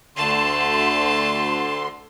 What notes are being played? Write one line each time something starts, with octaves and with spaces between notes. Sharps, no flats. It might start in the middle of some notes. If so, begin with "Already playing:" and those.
D2 D3 A3 A5 C6